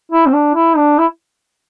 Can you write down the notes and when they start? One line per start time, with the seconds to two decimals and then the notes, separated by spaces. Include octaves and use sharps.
0.12 E4
0.26 C4
0.33 D4
0.54 E4
0.76 D4
0.98 E4